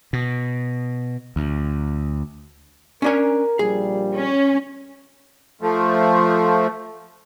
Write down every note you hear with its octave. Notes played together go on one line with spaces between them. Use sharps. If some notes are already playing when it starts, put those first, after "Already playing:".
B2
D2
C#4 D4 A#4 G#5
A#1 A#2 G3 G#4
C#4
F3 A3